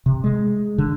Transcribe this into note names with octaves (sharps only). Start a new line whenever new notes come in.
C3
G#3
D3